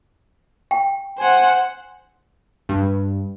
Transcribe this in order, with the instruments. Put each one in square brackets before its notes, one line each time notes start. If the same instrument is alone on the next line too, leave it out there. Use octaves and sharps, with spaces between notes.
[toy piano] G5
[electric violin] C5 F#5 [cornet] G#5
[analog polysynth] G2